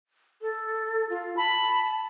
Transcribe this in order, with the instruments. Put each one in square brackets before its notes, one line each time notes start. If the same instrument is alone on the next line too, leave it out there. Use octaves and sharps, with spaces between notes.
[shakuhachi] A4
F4
[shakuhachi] A5 [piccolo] B5